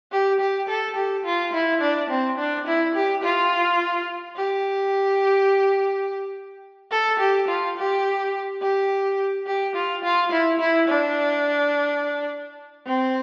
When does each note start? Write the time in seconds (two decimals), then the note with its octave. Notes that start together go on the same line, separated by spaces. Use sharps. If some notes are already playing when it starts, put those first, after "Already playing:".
0.12 G4
0.40 G4
0.69 A4
0.97 G4
1.25 F4
1.53 E4
1.82 D4
2.10 C4
2.38 D4
2.67 E4
2.95 G4
3.24 F4
4.36 G4
6.92 A4
7.20 G4
7.48 F4
7.77 G4
8.62 G4
9.47 G4
9.76 F4
10.04 F4
10.32 E4
10.60 E4
10.89 D4
12.87 C4